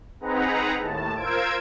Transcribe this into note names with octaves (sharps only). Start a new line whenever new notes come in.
C4 D#4 G#4 B4 F#5 A#5
D#2 A2 A5
F4 A#4 C5 E6 G#6 D7